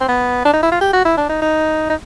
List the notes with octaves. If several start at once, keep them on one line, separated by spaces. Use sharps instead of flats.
C4
B3
D4
D#4
E4
F4
G4
F#4
E4
D4
D#4
D#4
D#4